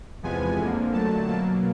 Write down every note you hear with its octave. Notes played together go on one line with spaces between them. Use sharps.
E2 C3 F3 G#3 B3 G#5
F2 D3 F3 A#3
F2 D3 F#3 A3 A5
B2 F#3 A#3 A5